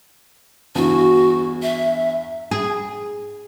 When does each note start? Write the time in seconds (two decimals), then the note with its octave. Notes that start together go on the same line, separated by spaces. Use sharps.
0.75 E2 G2 F#4
1.62 E5
2.51 G#4